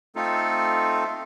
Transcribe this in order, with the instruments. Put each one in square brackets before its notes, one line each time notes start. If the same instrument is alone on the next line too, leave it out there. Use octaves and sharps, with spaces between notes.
[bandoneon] A3 C4 D#4 F4 A4